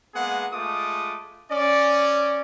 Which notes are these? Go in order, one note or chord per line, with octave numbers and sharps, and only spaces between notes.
G#3 A#3 B3 G#4 F#5
G#3 A3 F4 D6 D#6
C#4 D5